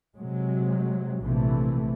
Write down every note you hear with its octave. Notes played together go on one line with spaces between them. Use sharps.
C3 F#3 G#3
A#1 C3 E3 A3